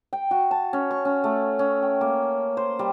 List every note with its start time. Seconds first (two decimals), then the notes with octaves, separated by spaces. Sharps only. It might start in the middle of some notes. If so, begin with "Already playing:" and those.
0.13 G5
0.31 F#4
0.51 A5
0.73 C#4
0.91 C#6
1.05 C#4
1.24 A3
1.59 C#4
1.82 G5
2.01 A#3
2.57 C5
2.79 G3